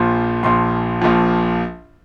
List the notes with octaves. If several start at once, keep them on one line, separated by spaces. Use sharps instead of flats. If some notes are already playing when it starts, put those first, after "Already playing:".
Already playing: A#1 A#2 F3
A#1 A#2 F3 C6
A#1 A#2 F3